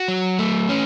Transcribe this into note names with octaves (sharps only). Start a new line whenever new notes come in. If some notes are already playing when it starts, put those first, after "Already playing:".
Already playing: F#4
F#3
A3
C#4